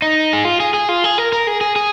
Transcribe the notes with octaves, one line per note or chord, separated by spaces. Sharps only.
D#4
G#4
F4
G#4
G#4
F4
G#4
A#4
A#4
G#4
G#4
G#4